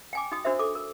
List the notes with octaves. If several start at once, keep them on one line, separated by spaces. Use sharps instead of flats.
G5 G#5 D6
D#4 F#4 G5 D#6
D4 F#4 A#4 C5 E5
A4 D6
A#4